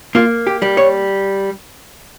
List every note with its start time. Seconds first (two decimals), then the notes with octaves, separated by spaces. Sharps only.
0.15 A#3 F4
0.47 G4
0.62 G3
0.77 C#5